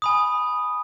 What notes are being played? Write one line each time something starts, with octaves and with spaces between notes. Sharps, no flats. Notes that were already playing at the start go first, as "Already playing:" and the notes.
G#5 B5 D#6